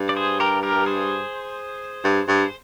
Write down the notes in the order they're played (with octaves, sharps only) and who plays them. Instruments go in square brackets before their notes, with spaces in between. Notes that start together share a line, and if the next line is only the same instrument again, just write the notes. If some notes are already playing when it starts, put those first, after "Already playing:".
Already playing: [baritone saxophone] G2
[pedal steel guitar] D5
G#4 C5
G4 A#4
G4 A#4
G#4 C5
[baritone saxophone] G2
G2